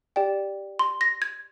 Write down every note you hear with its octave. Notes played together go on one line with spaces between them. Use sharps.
G4 D5 G5
C6
A#6
G#6